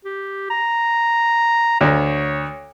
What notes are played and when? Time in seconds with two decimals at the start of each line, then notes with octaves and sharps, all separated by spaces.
0.05 G4
0.50 A#5
1.81 D2 C#5